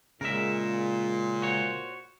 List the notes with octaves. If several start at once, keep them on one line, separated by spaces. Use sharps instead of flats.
A#2 C#3 G#3 A#4 E5
F#4 C5 C#5